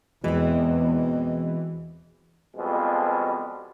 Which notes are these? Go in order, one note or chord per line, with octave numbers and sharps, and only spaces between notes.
E2 B2 E3 G#3 C4
F2 B2 F3 G3 G#3